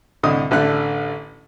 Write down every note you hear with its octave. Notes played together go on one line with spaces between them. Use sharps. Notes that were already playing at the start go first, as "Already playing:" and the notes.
C2 A2 D3 D#5 D#6
A1 D3 A3 F#6